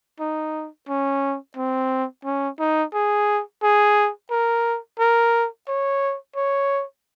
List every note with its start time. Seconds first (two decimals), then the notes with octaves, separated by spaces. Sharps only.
0.20 D#4
0.88 C#4
1.57 C4
2.25 C#4
2.59 D#4
2.93 G#4
3.63 G#4
4.31 A#4
4.99 A#4
5.68 C#5
6.36 C#5